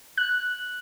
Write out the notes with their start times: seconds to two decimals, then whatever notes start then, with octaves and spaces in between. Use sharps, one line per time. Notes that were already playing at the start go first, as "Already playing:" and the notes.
0.18 F#6